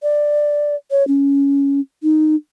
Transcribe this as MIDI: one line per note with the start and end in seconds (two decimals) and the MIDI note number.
0.03 0.76 74
0.91 1.06 73
1.08 1.80 61
2.03 2.35 63